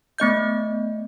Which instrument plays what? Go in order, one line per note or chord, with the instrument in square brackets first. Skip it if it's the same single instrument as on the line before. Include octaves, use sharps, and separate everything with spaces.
[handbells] A3 B3 D#5 G6